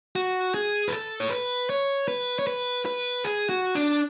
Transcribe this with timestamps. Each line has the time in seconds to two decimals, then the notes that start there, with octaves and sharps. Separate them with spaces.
0.15 F#4
0.54 G#4
0.88 B4
0.92 A4
1.20 C#5
1.31 B4
1.70 C#5
2.08 B4
2.39 C#5
2.47 B4
2.86 B4
3.24 G#4
3.49 F#4
3.75 D4